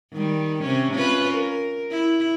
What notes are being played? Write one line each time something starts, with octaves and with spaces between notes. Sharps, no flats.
D#3 G3
C3 C#4
C#4 F4 B4
A#4
E4